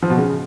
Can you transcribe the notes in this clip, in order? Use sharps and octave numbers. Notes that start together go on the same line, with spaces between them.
F3
B2
C#3